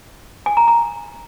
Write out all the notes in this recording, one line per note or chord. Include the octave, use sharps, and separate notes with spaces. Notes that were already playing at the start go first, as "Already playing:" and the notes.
G#5
A#5
A#5